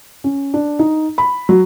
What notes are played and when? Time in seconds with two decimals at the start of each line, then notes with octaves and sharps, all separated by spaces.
0.24 C#4
0.54 D4
0.79 D#4
1.18 B5
1.49 F#3